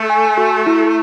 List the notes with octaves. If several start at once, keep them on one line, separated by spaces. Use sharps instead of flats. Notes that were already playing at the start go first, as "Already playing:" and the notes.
Already playing: A3
G#5
F#4
E4